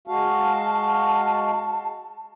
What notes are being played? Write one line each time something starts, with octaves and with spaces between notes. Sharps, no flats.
G#3 F#4 F5 A5